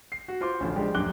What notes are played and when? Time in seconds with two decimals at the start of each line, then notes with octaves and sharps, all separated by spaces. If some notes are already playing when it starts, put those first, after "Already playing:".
0.12 C7
0.28 F#4
0.41 F4 C5 C6 D6
0.60 A1 D2 F3
0.76 F3 G3 G#3 D4 G4
0.95 D#1 A#1 F#2 D6 F#6 G7